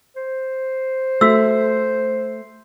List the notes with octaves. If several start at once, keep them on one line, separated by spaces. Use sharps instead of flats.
C5
A3 F#4 E6